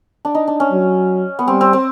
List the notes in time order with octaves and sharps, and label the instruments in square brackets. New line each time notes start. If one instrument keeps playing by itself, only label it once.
[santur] D4
D#4
D4
C#4
[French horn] F#3
[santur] B3
[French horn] G3 [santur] C4
[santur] C4
C4